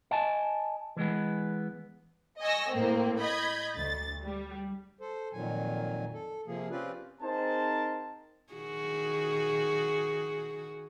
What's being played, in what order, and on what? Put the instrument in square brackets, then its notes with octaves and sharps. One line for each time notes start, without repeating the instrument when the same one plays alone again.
[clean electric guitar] D#5 G#5 A5
E3 G#3 B3
[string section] D#5 G#5 C#6 E6 A#6
A2 A#3 C4
D#5 B5 G6 G#6
D2 A6
G3
[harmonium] A4 C5
F2 A#2 D#3 F#3 G#5
A4
C3 F3 A#3 G#4
C4 C#4 F4 G4 B4 D5
[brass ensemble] C4 D#4 G#4 A#4 C5 A5
[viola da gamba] D#3 F#4 G#4